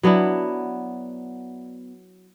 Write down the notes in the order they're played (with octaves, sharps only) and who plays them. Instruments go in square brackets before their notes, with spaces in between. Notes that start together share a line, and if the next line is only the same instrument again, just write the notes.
[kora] F#3 B3 D4 E4